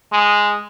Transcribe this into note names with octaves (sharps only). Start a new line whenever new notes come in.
G#3